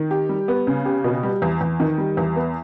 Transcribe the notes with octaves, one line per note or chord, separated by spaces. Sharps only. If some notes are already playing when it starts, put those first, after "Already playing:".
Already playing: D#3
G4
G3
B3
C#3
G4
B2
G3
E2
E2
D#3
G3
E2
B3